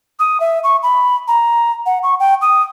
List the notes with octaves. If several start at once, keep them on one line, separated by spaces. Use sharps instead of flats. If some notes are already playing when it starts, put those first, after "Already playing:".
D#6
E5
C#6
B5
A#5
F#5
C#6
G5
D#6